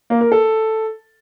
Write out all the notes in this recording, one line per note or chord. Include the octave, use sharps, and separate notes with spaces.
A#3
A#4
A4